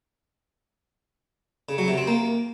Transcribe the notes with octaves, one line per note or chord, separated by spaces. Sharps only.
C#3
F#3
C3
C4
A#3